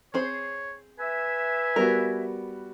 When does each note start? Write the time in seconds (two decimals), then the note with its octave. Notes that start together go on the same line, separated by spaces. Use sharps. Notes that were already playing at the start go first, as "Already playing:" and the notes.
0.14 C4 G#4 C5 C#5
0.99 B4 E5 G#5
1.76 G3 B3 F#4 A#4